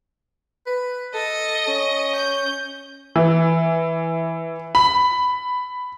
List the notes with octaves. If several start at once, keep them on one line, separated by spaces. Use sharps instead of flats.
B4
A4 D#5
C#4
G6
E3
B5